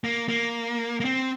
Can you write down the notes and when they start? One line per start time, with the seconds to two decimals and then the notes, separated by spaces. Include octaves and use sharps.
0.04 A#3
0.29 A#3
1.00 A#3
1.05 C4